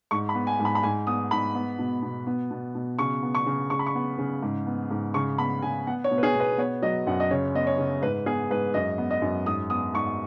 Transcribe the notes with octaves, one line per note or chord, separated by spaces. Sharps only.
G#2 C#6
B5
B3
G#5
G#2
B5
B5
G#2 G#5
B3 D#6
G#2 B5
B3
B2
B2
B3
B2
B2
C#3 C#6
B3
C#6
C#3
C#3 C#6
B5
C#6
B3
C#3
G#2
B3
G#2
C#3 C#6
B3 B5
C#3 G#5
B3 F#5
C#5
B2
B4
G#4
B2 B4
B3 C#5
F#3 D#5
F#2 F#5
D#5
C#3 C#5
B3 D#5
C#5
C#3
G#2 B4
B3 G#4
G#2 B4
F#2 D#5
B3
D#5
F#2
G#2 D#6
B3 D#6
G#2 C#6